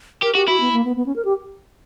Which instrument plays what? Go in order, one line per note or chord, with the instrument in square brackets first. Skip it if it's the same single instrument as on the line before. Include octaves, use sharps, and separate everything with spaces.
[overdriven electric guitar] G4 [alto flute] A#4
[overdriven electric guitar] F#4 [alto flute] G4
[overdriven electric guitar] E4 [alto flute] F#4
[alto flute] B3
A#3
B3
B3
C#4
A#4
G4